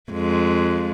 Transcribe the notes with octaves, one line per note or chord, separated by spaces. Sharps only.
F2 G#3